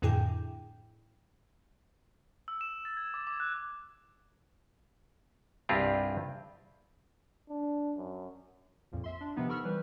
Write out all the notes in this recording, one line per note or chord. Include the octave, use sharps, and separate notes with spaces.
F2 A2 D3 E4 G#4 G5
E6
E7
A6
G#6
D6
D6
F#6
C2 G2 C4 F4 G4 G#4
D4
F#2
A#1 F2 A#2
E5 C6
D4
C3 D#3 F3 B3 D#4
A4 A#4 B5 C#6 E6 F6
E3 G3 B4 C5